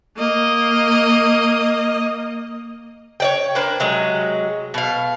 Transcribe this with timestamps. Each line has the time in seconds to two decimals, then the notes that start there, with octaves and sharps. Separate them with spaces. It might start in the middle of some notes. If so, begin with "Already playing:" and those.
0.17 A#3 D#5
3.20 C#5 D5 G5
3.55 A#3 D4 B4 C5
3.80 C3 F#3 G#3
4.74 B2 F5